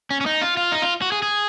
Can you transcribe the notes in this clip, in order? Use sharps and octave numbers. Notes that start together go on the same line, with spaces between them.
C#4
C#4
D#4
F4
F4
D#4
F4
F#4
G#4
G#4